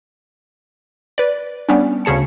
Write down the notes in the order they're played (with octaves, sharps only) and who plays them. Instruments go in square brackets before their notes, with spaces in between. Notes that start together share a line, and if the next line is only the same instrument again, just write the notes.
[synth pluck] B4 D5
G3 B3 C#4 D4
D2 C#3 G#4 A5 C#7